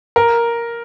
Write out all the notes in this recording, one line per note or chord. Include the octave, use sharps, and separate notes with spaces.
A#4